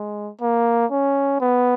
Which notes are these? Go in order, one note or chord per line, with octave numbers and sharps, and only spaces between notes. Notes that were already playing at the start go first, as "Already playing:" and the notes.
Already playing: G#3
A#3
C#4
B3